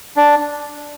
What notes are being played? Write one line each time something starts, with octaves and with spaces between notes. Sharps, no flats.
D4